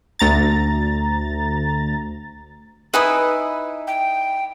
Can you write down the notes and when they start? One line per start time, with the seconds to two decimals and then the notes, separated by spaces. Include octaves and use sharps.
0.19 D2 A#5 A6
2.94 D#4 E4 B4 E5 G#5 D#6
3.87 G5